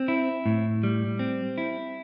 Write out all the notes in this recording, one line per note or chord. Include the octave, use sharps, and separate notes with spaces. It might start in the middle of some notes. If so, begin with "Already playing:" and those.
Already playing: C4
E4
A2
G3
C4
E4